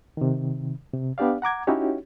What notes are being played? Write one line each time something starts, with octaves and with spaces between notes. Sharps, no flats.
C3 D#3
C3
B3 D4 G4 D5 F5
F#5 A#5 D6 G#6
C#4 D#4 E4 F#4 G4 C#5